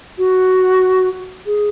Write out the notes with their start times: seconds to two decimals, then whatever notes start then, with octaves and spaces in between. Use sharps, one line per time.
0.18 F#4
1.46 G#4